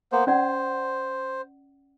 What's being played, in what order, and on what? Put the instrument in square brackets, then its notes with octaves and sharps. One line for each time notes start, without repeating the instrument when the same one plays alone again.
[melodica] A#3 B3 C5
[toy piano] C#4 D5 F#5 [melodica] C5